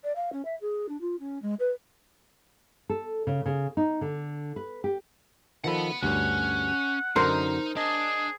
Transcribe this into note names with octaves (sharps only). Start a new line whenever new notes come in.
D5
F5
C#4
E5
G#4
D4
F4
C#4
G#3
B4
A4
C#3
C#3
D#4
D3
B4
G4
D#3 F3 A4 F#5 B5
D2 G2 C#4 F#5
F#2 D3 D#4 A#4 C5
D4 G#4 D#5